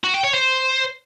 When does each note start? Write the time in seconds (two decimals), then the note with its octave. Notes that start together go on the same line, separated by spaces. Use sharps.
0.04 F#4
0.14 G5
0.24 C#5
0.34 C5